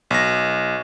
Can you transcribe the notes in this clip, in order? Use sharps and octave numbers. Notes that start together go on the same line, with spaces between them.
B1 A#6